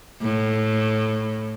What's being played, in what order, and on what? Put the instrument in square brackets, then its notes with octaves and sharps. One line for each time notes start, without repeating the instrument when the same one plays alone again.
[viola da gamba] A2